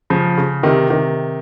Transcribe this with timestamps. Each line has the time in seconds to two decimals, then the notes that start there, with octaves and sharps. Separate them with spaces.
0.10 C#3 F3
0.38 C#3
0.63 C3 D#3
0.90 C3 D#3